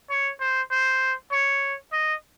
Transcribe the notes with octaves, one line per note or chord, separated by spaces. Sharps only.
C#5
C5
C5
C#5
D#5